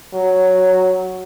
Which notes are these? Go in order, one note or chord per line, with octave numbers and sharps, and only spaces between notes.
F#3